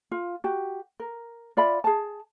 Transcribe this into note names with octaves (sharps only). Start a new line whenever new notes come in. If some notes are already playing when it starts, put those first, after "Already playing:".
F4
F#4 G4
A#4
F4 D5 E5 B5
G#4 A5